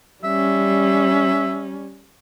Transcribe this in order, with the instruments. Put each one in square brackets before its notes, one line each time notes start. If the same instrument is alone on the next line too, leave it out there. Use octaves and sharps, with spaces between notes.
[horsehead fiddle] G3 C#4 [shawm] E5